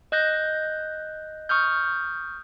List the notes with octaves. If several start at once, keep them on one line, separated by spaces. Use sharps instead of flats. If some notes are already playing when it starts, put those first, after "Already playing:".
D#5 F#6 G6 A#6
C#6 D#6 F6 G6